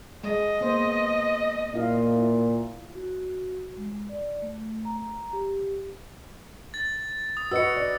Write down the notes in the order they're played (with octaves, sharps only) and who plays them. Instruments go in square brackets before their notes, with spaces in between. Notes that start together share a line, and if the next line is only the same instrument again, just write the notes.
[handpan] G#3 [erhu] D#5
[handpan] A#3 B3 C5
[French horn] A#2 [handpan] E4 F4 F5
[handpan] E4
[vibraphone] F#4
G#3
D5
A3
A#5
G4
[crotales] A6
D#6
[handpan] F#4 B4 D#5 [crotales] E6 C#7
[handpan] D5